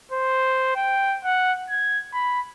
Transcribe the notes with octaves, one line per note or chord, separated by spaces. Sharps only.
C5
G5
F#5
G#6
B5